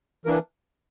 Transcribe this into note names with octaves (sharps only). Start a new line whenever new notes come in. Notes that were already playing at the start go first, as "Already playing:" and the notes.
E3 A#3 D4 A#4